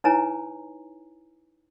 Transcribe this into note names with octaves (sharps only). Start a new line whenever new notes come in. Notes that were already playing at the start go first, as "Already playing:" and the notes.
D#4 E4 B4 C#5 G#5 A#5